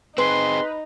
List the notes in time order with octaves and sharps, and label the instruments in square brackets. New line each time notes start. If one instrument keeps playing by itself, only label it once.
[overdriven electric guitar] C4 G#4 [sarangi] D#4 [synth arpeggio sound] B4 [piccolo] C6